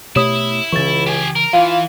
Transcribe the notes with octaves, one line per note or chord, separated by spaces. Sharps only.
B2 A3 E4 G4 C#5 E5 D#6
C#2 C#3 E3 C#6 A6
G4 G#5
A#4
E3 F4 F5 D#7